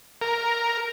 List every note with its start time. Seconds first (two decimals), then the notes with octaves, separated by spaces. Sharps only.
0.21 A#4